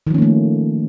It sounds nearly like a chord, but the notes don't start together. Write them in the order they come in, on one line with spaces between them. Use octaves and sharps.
D#3 F3 C#4 A#3 A3